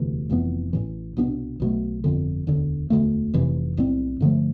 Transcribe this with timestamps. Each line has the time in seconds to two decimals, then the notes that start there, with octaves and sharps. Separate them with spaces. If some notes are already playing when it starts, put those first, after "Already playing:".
Already playing: E1 D2 C3 E3
0.30 F1 F2 E3 B3
0.73 A1 A2 E3
1.17 C2 B2 B3 D4
1.60 B1 B2 A3
2.04 G1 F2 D3
2.47 E1 D2 D3
2.90 E1 D2 D3 A3
3.34 F1 F2 C3 E3
3.77 B1 A2 G3 C4
4.20 G2 D3 F3 A3